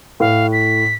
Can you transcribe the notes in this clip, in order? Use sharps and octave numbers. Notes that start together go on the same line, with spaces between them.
A2 F5
B6